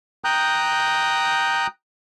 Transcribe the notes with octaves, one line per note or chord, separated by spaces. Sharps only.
G5 A#5 D#6 F#6 G6